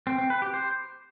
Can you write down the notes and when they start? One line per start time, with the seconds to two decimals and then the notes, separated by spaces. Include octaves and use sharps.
0.07 C4
0.18 C4
0.30 B4
0.42 G4
0.54 C5